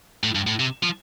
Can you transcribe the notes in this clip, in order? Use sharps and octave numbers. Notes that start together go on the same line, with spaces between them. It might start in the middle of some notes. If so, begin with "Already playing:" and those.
A2
G2
A2
C3
F3